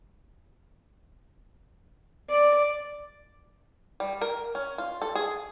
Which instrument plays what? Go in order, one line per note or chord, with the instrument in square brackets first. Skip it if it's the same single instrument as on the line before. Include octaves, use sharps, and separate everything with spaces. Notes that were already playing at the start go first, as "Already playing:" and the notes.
[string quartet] D5
[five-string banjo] G3
A#4
C#4
F4
A4
G#4